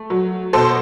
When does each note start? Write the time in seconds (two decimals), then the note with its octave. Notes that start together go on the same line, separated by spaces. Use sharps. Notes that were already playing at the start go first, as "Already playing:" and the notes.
Already playing: A3
0.10 F#3
0.53 B2 A4 C5